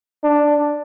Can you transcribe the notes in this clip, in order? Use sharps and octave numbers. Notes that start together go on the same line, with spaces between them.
D4